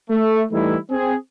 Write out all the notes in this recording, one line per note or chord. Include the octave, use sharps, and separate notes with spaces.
A3
E3 G3 A3 D#4 E4
C4 G#4